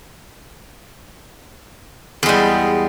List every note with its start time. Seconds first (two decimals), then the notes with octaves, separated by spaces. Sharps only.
2.23 E2
2.26 G#3
2.29 G3